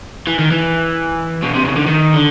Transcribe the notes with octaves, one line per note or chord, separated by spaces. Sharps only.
E3
D#3
E3
B2
C3
C#3
D3
D#3
D3